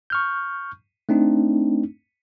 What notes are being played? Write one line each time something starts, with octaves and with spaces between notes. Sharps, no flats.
C#6 F6 G6
A3 C4 D4 D#4